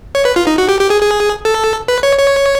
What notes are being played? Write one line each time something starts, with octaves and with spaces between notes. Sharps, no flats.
C#5
B4
F4
D#4
F#4
G4
G4
G#4
G#4
A4
B4
C#5
C#5